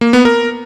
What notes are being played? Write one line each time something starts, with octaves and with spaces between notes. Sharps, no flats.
A#3
B3
A#4